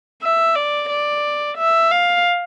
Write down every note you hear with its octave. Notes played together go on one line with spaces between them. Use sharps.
E5
D5
D5
E5
F5